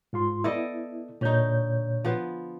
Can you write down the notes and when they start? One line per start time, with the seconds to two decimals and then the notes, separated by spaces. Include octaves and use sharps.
0.13 G#2 F4 C6
0.44 B3 E4 A4 D5 D#5
1.21 A#2 D3 D#4 C#5 G6
2.05 F3 B3